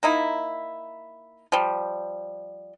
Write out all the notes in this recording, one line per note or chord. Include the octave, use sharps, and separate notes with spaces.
A#3 D#4 E4
F3 G3